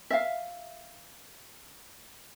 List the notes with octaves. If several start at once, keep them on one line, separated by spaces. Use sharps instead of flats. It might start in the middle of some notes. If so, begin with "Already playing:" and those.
E5 F5